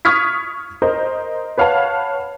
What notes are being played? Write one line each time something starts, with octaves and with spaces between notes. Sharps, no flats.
C#6 D#6 F6 G#6 B6
A#4 C5 D#5
B4 C#5 F5 F#5 A5